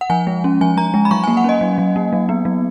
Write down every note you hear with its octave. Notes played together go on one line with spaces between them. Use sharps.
F#5
F3 G#5
G#3
C#4
F3 G#5
F3 A#5
G#3
B5
F#3 C#6
G#5
A#3
F#5
C#4 D#5
F#3
F#3
A#3
F#3
B3
F#3